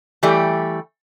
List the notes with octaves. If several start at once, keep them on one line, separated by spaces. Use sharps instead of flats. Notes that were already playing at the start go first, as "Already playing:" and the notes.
E3 G3 A3 G4